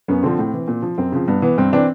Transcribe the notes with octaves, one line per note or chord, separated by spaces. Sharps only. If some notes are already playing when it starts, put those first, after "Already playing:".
F#2 B3 C#4
D3 F3 C4
A2
E3
A#2
F3
F#2 C4
C#3 F3
G2 B3
E3 B3
G2 C4
E3 C4 D4